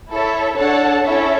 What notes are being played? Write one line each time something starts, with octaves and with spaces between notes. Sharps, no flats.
E4 A4 C#5 E5
D4 A4 C#5 F#5 A5
C#4 E4 A4 C#5 E5